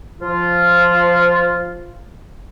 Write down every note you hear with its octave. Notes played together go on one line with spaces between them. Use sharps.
F3 F4